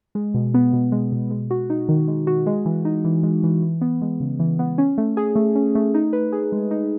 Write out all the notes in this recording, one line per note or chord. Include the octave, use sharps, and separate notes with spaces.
G#3
B2
B3
B2
G#3
B2
G#3
F#4
D#4
D#3
G#3
F#4
G#3
E3
D#4
E3
G#3
E3
E3
B3
G#3
C#3
E3
B3
C#4
A3
G#4
A3
C#4
A3
D#4
B4
G#4
G#3
D#4